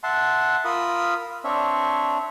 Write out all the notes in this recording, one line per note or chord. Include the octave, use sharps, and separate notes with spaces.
E5 F#5 A5 C6
F4 A#4 B5 D#6 E6
C4 D4 C#5 E5